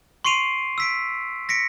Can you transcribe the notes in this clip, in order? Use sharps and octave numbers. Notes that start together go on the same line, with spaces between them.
C6 C#6 C7 D7 D#7 F7
E6 B6 D7
A#6 B6 C#7 D7